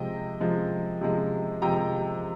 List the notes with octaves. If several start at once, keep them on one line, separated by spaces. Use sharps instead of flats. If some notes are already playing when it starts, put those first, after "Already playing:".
Already playing: C3 F3 G#3 D#5 G5
C3 F3 G#3
C3 F3 G#3
C3 F3 G#3 G5 A#5